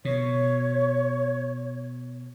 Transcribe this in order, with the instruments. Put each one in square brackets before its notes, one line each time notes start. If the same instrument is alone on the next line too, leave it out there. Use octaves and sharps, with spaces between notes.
[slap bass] B2 [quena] C#5